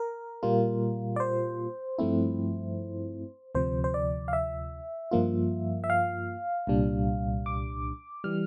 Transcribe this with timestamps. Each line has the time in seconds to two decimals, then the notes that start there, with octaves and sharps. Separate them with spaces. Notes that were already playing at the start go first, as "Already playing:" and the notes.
Already playing: A#4
0.43 A#2 G3 A#3 F4
1.16 D5
1.20 C5
1.99 G2 F3 A3 C4 E4
3.55 D2 C3 F3 C5
3.84 C5
3.94 D5
4.28 F5
4.33 E5
5.11 G2 F3 A#3 F4
5.84 E5
5.90 F5
6.67 C2 A#2 G3 D4
7.46 D6
8.24 E3 G3 F6